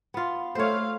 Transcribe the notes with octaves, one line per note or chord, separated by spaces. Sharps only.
B3 F4
A3 C5 C#5 F5